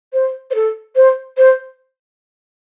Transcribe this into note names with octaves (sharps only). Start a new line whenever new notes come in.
C5
C5
A4
C5
C5